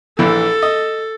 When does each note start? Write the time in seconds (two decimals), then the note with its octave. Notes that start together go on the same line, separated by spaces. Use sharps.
0.19 A#1 E3 A4
0.62 D#5